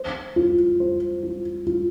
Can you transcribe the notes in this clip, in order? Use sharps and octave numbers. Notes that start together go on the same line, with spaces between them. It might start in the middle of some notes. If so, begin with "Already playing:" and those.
Already playing: C5
F4
C5
F4
F4